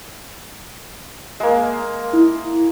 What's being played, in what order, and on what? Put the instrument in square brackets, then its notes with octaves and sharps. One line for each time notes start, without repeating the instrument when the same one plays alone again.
[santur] G#3 A#3
[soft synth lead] E4